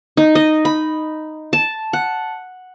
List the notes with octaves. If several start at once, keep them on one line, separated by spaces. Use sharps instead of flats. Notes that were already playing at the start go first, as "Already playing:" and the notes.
D#4
D#5
B5
A5
F#5